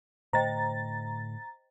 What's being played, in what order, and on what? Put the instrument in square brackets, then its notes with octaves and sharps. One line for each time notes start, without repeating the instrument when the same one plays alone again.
[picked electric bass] A2 D3 A3 [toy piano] C5 D#5 G5 [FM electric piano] A#5 A6